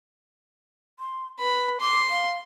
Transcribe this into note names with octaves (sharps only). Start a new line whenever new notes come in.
C6
B4 B5
C6 D6
F5